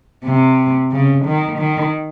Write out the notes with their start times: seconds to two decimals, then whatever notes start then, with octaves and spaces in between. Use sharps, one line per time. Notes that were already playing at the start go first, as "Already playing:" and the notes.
0.25 C3
0.92 C#3
1.25 D#3
1.59 D#3